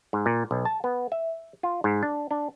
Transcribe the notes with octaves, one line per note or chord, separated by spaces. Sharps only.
G#2
A#2
B1
A5
B3
E5
F4
G#2
D4
D4